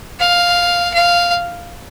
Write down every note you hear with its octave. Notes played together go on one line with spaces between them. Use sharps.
F5
F5